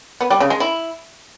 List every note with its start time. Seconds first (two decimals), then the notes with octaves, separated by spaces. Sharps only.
0.21 B3
0.30 G3
0.40 C#3
0.50 G#3
0.60 E4